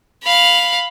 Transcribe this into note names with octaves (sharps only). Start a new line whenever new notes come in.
F5 B5